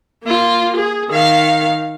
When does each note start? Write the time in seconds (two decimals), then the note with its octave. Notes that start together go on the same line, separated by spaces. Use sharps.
0.24 A#3 F4
0.76 G#4
1.10 D#3 F5